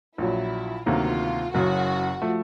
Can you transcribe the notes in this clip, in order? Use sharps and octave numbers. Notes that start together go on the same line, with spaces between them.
A#1 A#2 F#3 E4
D2 C3 D#3 F#3 A#3 F4
F#1 F#2 C#3 F#4
F3 A3